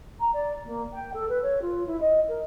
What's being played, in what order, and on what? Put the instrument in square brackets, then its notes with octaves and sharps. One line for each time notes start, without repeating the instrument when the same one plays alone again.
[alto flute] A#5
D5
A#3
G5
A4
B4
C#5
F4
E4
D#5
A#4